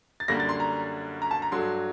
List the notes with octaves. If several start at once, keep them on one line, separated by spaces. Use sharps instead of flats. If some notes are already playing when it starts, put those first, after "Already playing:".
A6
F#2 D3 G3 A#3 A#6
A6
C6
A#5
A#5
A5
A#5
G2 F#3 A3 C6